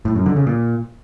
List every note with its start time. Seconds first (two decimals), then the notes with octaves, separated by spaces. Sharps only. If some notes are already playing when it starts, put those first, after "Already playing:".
0.05 A2
0.16 F#2
0.26 D3
0.36 C#3
0.47 A#2